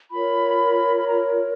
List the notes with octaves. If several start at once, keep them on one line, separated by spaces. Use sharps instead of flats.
F4 A#4 C#5 B5
B5
A#5